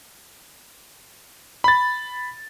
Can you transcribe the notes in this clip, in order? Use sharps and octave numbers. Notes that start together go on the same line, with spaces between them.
B5 A6